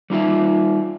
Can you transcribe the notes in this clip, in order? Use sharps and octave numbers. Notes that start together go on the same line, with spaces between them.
G3 D#4 F4 E5